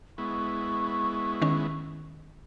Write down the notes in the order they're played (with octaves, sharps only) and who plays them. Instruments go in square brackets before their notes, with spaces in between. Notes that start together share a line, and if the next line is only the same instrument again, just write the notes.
[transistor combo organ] G#3 B3 E4 [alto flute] C#6
[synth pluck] D#3 C#4